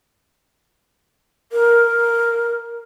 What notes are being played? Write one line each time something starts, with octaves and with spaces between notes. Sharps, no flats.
A#4